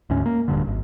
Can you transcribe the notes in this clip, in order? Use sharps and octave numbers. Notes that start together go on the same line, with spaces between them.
D2 G#2 C#4
A#3
D1 G2 D3
G#1